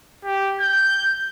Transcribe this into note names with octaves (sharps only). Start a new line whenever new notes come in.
G4
G6